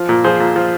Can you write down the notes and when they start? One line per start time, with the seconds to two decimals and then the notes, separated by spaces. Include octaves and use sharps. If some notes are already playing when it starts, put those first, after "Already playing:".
Already playing: F3
0.09 A#2
0.24 F3 G#4 C5
0.40 A#2
0.56 F3